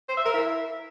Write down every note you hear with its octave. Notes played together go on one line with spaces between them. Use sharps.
C5
E5
A#4
E4